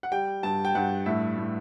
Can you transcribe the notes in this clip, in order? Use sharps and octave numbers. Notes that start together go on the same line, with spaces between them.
F#5
G3 G5
G2 A5
G5
G2 F#5
A2 E5
A2